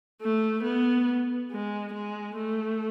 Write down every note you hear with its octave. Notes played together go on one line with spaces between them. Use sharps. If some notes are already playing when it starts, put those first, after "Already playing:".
A3
B3
G#3
G#3
A3